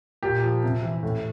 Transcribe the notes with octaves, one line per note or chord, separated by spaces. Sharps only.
A#2 G4
F3
C3
E3
A2